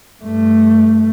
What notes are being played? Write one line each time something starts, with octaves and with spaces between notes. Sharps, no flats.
G2 A3